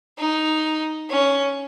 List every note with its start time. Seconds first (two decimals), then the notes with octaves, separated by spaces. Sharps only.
0.18 D#4
1.10 C#4